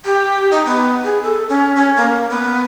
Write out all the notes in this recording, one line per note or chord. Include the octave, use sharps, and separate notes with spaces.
G4
D#4
B3
G#4
A4
C#4
C#4
A#3
B3